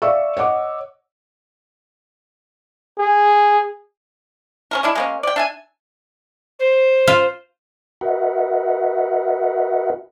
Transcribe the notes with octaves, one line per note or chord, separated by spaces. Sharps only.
D5 E5 F5 C#6 E6
C#5 D#5 F#5 D6
G#4
C#4 A4 A#4
G#3 D4 E4
G#3 A#3 C#4
D5 G5
D4 E5 G#5
C5
F4
F#4 A#4 B4 D#5 E5 F#5